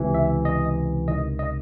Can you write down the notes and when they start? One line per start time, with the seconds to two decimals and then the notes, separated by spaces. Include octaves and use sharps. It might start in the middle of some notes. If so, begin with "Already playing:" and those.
Already playing: C#2 C3 E3
0.14 E5
0.45 D#5
1.08 C#2 C3 D#3 D#5
1.39 D#5